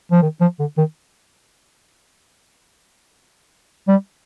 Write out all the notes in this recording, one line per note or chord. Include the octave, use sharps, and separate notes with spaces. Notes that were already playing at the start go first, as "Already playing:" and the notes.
F3
D#3
F3
D3
D#3
G3